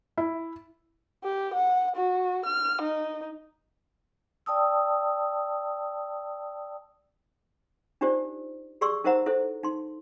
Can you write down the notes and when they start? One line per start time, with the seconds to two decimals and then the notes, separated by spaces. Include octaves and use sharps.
0.17 E4
1.24 G4
1.54 F#5
1.96 F#4
2.45 F6
2.81 D#4
4.46 D5 G5 A5 D#6 E6
8.01 D4 D#4 F4 G4 C5 D5
8.81 G4 G#4 D5 C6 C#6 E6
9.04 D#4 A#4 C5 E5 F#5 A#5
9.26 E4 A4 C5 E5
9.63 D#4 C6